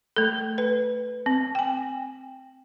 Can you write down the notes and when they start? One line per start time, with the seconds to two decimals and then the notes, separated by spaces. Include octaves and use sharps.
0.16 A3 A4
0.58 B4
1.26 C4
1.55 G5 G#5